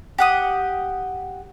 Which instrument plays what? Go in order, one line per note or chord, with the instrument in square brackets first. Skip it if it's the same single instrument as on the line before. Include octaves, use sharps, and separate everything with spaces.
[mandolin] G4 F#5 D#6